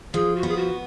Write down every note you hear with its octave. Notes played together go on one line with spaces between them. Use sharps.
F3 G#4
F#4
B3 G#4
F#4